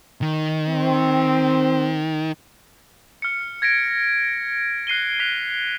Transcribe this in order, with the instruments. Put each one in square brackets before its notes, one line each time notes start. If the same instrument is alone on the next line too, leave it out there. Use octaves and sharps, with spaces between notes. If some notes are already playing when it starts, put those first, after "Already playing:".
[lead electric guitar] D#3
[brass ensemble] C4
[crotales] F6 C#7
G#6 A#6 B6 D7
F#6 C7 D#7 G7
F#6 B6 F7